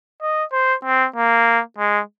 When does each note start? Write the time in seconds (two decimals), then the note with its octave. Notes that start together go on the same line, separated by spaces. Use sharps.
0.22 D#5
0.52 C5
0.84 C4
1.16 A#3
1.78 G#3